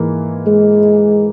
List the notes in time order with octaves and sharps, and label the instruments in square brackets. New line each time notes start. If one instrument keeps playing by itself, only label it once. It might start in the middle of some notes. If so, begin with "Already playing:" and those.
Already playing: [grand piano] G#2 E3 A#3
[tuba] G#3